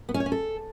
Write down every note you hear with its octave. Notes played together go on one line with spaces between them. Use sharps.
B3
C#4
C#5
C#4
A4